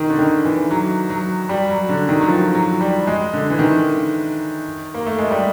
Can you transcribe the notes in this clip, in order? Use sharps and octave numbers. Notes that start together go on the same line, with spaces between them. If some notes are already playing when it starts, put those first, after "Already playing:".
Already playing: D#3
D3
D#3
E3
F#3
F#3
G3
F#3
D3
D#3
F#3
F3
F#3
G3
G#3
D3
E3
D#3
A#3
A3
G#3
G3